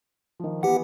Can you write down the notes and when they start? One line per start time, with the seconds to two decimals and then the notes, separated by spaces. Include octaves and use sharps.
0.40 D#3 F3
0.63 E3 B3 G4 F#5